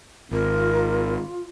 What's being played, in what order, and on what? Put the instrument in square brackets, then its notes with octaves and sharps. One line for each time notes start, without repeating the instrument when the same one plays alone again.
[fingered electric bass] G#1 [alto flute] F4 [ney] A#4